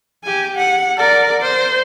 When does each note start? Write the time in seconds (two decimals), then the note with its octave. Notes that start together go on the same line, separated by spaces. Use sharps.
0.24 G4 G#5
0.56 F#5
0.98 A#4 D5
1.42 C5